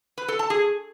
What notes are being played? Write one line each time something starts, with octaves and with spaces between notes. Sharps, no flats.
B4
A4
A5
G#4